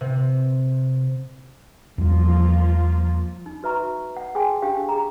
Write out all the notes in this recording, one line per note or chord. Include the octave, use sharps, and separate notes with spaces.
C3
E2 F3 G3 A#3 F4
D#4
F#4 B4 E5 A#5 C#6
F#5
G#4 G5 G#5 C6
D4 G4 F5 G5
G#4 A#5